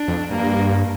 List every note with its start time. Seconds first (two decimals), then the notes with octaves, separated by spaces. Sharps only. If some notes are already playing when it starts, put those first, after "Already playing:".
Already playing: D4
0.08 F2
0.31 G2 A#3